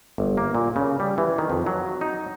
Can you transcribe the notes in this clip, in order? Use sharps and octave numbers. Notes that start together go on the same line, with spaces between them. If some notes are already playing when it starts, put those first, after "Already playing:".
G1
A#3
A#2
C#3
G3
E3
D#3
F2
F#3
D#4